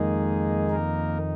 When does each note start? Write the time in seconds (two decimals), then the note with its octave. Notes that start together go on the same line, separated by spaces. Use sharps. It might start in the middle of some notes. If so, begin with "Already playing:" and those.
Already playing: F2 D#3 G#3 A#3 D#4 G#4
0.71 A#3 A#4